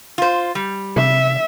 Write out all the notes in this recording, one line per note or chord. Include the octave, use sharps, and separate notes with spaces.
F4 C5
G3
C3 E5